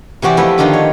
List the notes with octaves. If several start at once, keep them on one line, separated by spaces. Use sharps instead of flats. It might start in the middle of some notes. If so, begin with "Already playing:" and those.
C3 E3 F#4 G4 D5
F3 A3 B3 E4 B4
D3 D#3 F3 D4 F4
C#5